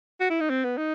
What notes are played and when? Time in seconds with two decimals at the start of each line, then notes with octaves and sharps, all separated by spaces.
0.21 F#4
0.30 E4
0.40 D#4
0.50 C4
0.64 B3
0.78 D#4